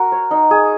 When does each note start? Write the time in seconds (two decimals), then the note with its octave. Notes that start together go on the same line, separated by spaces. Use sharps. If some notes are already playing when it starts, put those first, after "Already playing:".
Already playing: F#4 A#4
0.12 C#5
0.31 D#4
0.51 G#4